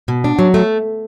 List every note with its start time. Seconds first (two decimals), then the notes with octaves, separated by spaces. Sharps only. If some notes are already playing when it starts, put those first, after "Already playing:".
0.08 B2
0.24 D4
0.39 F#3
0.54 A3